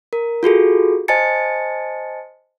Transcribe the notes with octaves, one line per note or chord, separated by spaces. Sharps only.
A#4
F4 F#4 G#4 A4
C5 D#5 G#5 A5 A6 C#7